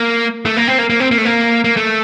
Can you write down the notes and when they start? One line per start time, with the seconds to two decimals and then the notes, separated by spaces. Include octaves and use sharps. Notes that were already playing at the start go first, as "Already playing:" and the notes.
Already playing: A#3
0.46 A3
0.57 A#3
0.68 C4
0.78 A#3
0.90 A#3
1.00 C4
1.11 A#3
1.18 A3
1.25 A#3
1.64 A#3
1.77 A3